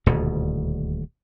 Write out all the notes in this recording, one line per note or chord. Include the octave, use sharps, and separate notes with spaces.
D#1 D2 B2 D3